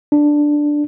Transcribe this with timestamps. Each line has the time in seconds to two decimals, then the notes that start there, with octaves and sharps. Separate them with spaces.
0.12 D4